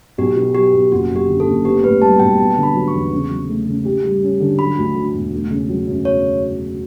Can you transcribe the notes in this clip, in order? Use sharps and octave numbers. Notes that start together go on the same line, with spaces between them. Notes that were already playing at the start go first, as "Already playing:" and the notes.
B1 G4
B2
F#3 G4
B1
F#1 F#4
F#2
G4
D3
A4
F#1
B3 G4
A2 B4
G3 A5
B1 G5
B3 A5
D3
B5
F#3
C#6
E2
C#3
F#3
A3
C#3
G4
G3
C#4
D3
F#3 B5
D2
D3
E1
A3
C#3
F#3
F#2
C#5